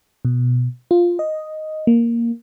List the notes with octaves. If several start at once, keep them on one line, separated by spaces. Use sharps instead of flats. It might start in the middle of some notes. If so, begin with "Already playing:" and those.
B2
F4
D#5
A#3